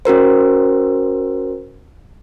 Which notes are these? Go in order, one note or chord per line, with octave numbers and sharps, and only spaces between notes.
C#4 F#4 A#4 C5